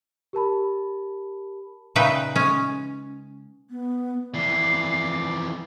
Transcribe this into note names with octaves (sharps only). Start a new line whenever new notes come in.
G4 A#4 A5 B5
A#2 C#3 D#4 B4 E5 G5
G#3 C#4
B3
F2 E3 D5 C7